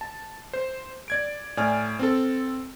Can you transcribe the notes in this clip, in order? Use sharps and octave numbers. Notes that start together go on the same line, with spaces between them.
A5
C5
D5 G#6 D7
A2 D5 G#5 F6
C4 A4